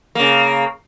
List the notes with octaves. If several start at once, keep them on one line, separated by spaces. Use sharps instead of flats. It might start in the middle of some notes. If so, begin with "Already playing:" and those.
C#3 A#3